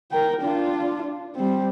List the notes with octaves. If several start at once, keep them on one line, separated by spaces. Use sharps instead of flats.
A#4 G5
D4 F4
G3 C4